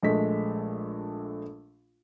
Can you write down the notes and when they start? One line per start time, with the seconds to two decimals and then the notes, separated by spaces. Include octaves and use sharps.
0.03 A#1 G#3 A3 B6